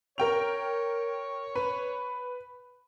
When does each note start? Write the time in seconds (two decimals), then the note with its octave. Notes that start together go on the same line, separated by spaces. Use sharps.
0.18 A#4 C#5 G5 F7
1.55 B4